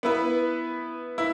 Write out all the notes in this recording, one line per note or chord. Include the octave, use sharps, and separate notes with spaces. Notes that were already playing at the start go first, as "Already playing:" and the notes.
B3 E4 B4
E4